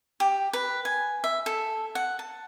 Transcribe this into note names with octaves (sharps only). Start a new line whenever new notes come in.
G4
B4
G#5
E5
A4
F#5
A5